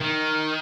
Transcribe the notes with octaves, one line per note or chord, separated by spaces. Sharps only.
D#3